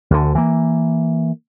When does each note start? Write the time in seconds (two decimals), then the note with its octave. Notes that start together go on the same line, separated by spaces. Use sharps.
0.10 D2 D3
0.35 E3 A#3